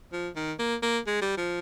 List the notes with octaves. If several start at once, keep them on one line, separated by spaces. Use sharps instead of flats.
F3
D#3
A#3
A#3
G#3
G3
F3